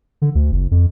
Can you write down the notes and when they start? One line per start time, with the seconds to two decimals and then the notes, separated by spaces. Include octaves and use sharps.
0.22 D3
0.35 D2
0.52 F#1
0.71 F2